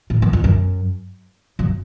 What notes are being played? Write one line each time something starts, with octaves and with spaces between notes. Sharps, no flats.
A2
F#2
F2
F#2
F#2